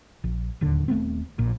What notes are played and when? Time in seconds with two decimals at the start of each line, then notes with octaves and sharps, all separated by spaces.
0.24 A#1
0.61 D1 D#2 D3
0.88 D#1 A3 B3 C4
1.39 A#1 A#2